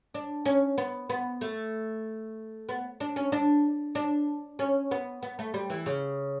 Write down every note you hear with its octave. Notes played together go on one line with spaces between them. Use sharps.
D4
C#4
B3
B3
A3
B3
D4
C#4
D4
D4
C#4
B3
B3
A3
G3
E3
C#3